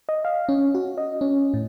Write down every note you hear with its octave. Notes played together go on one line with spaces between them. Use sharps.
D#5
F5
C#4
F#4
D#5
C#4
A2